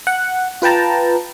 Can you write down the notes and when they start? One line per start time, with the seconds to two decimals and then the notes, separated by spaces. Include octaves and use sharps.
0.07 F#5
0.62 F4 B4 G5 A5 A#5